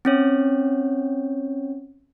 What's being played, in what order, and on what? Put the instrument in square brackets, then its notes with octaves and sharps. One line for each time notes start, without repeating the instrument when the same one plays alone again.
[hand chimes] C4 C#4 C#5